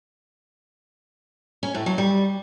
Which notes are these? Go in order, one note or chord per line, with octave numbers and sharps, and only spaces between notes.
C#4
A2
F#3
G3